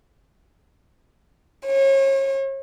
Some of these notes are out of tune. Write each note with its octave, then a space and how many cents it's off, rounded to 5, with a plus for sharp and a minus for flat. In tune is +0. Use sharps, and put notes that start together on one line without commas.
C#5 -35